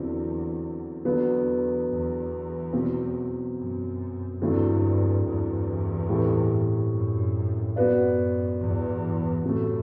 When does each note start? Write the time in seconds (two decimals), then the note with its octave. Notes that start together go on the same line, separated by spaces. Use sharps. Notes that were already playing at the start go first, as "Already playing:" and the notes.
Already playing: E2 D3 F#3 C4 E4
1.05 E2 D3 F#3 B3
1.89 E2
2.73 B2 F#3 C4
3.56 F#2
4.41 E2 G2 D3 F#3 A3 C4 E4
5.24 E2 G2
6.09 A2 G3 C4 E4 A4
6.93 F#2
7.76 F#2 B3 F#4 B4 D5
8.60 E2 G2
9.44 F#2 A2 C3 F#3 A3